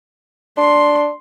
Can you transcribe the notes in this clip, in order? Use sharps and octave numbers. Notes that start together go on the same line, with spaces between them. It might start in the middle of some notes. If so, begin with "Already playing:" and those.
D4 C6